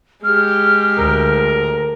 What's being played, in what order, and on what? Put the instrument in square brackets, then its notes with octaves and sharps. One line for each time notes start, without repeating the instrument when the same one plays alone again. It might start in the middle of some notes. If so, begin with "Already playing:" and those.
[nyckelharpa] G#3 G4 [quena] F6
[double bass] D2 [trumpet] A#4